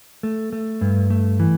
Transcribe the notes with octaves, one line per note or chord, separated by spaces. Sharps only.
A3
A3
G2
A3
E3